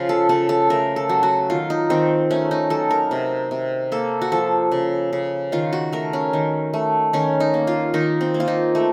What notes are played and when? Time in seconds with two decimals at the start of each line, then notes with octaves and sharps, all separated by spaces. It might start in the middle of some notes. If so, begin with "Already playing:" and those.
Already playing: C#3 F3 F4
0.09 A4
0.29 C#3 A4
0.49 A4
0.70 A3 A#4
0.96 A4
1.09 F#3
1.23 F#4
1.50 D#3 F4
1.70 D#4
1.90 D#3 C4
2.31 A3 C#4
2.51 D#4
2.70 F#3 A4
2.91 A#4
3.11 C3
3.51 C3
3.92 A#3 A4
4.22 F#4
4.32 F3 A4
4.72 C#3
5.13 C#3
5.52 D#3 F4
5.73 F#4
5.92 A3 A#4
6.13 C#4
6.33 D#3
6.74 A3
7.13 D#3 C#4
7.40 D#4
7.54 A#3
7.67 F4
7.94 D#3 D#4
8.21 C4
8.34 A#3
8.40 F4
8.48 D#4
8.75 A3